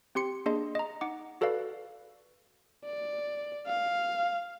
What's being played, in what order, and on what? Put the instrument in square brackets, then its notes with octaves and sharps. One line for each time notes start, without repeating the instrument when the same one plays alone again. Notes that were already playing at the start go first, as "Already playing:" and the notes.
[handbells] C4 G4 C6 C#7
A#3 D4 G#4 D#5 C6
D#5 A#5
D#4 F#5 D6
F#4 A4 B4 D5 F5
[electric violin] D5
F5